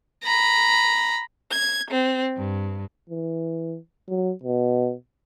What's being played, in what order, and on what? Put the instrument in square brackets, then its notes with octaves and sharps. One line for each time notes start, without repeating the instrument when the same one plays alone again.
[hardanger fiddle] A#5 B5
[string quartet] G#6
C4
G2
[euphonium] E3
F#3
B2